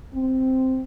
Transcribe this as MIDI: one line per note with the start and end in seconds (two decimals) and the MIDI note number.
0.15 0.81 60